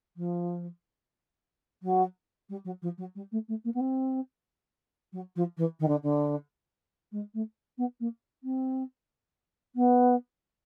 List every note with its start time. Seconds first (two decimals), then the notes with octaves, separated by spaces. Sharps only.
0.16 F3
1.82 F#3
2.49 G3
2.64 F#3
2.82 F3
2.97 F#3
3.15 G3
3.31 A3
3.48 A3
3.64 A#3
3.74 B3
3.80 C4
5.12 F#3
5.35 F3
5.57 E3
5.79 D#3
5.88 D3
6.03 D3
7.11 G#3
7.34 A3
7.77 B3
8.00 A#3
8.43 C4
9.75 B3